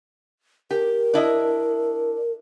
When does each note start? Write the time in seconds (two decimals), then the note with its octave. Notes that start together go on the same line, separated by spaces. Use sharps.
0.71 G4 A#4
1.14 D4 E4 D#5